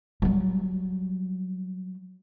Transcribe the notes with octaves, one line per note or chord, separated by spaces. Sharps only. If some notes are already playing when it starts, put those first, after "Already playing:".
F#3 G3